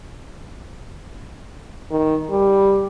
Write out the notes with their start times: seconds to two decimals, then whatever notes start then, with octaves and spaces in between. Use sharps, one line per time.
1.91 D#3
2.31 G3